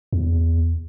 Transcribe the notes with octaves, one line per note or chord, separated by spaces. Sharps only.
E2